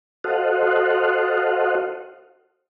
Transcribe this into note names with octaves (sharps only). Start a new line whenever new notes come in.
F#4 A4 C5 D#5 F5 F#5